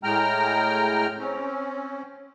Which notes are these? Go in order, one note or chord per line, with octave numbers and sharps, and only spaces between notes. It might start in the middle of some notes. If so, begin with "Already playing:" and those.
A2 G#3 G5 A#5 F6
C4 C#4